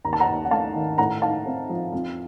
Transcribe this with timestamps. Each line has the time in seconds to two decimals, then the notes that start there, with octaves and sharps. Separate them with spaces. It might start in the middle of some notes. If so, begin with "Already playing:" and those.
0.04 D#2 A#5
0.13 A5
0.20 F#5 A#5
0.28 D#2
0.45 F#5
0.51 A3 F5 A5
0.75 D#3
0.98 A2 F#5 A#5
1.22 D#4 F5 A5
1.46 C4
1.69 F3
1.93 F2